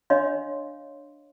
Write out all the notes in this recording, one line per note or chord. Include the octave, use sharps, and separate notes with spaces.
D4 C#5 D#5 F5 C6